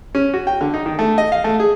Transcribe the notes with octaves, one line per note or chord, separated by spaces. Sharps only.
C#4
F#4
G5
D3
D#4
D#3
A3
D#5
F5
A3
G#4